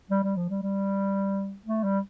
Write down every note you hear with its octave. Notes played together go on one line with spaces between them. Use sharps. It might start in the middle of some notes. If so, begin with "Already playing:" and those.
G3
G3
F3
G3
G3
A3
G3